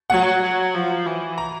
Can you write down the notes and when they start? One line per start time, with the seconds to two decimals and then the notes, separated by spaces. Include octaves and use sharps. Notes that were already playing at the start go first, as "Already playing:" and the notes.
0.10 F#3 F#5
0.42 F#3
0.74 F3
1.06 E3
1.38 A#5